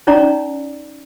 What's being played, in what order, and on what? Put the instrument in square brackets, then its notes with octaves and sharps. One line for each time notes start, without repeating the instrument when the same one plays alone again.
[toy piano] C#4 D#4 C#5 D5 A#5